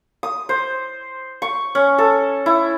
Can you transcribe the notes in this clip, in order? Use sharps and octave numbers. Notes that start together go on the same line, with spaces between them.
D#6
C5
C#6
C#4
A4
E4